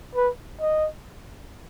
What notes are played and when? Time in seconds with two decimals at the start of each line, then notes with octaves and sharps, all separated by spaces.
0.15 B4
0.61 D#5